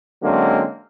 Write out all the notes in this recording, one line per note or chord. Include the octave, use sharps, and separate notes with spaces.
D3 F#3 G#3 A#3 C4 C#4